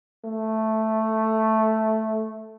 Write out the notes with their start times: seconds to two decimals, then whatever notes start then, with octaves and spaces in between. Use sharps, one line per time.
0.25 A3